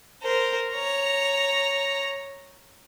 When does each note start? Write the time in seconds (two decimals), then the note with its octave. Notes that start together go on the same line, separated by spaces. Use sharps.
0.22 A#4 C5
0.72 C#5 A#5